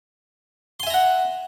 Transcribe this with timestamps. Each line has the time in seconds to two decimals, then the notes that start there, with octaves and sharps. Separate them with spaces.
0.80 C6
0.83 G#5
0.87 E5
0.90 A#5
0.94 F#5